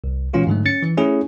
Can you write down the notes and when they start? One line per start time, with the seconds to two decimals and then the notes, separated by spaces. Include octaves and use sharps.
0.04 C2
0.33 A#2 E3 G#3 C#4 F4 F#4
0.47 G#2 D3 F#3 A3
0.65 C#4 A6 C#7
0.83 E3
0.97 A3 C#4 E4 G#4